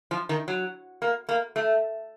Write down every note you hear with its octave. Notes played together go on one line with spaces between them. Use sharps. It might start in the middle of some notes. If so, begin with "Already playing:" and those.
F3
D#3
F#3
A#3
A#3
A3